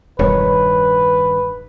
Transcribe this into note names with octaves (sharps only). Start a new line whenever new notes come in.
E1 G2 D#3 B4 C#5